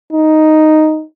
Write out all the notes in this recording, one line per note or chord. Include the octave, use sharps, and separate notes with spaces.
D#4